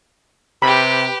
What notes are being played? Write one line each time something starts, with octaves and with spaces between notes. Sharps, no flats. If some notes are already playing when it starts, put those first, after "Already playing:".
C3 G4 B4 B5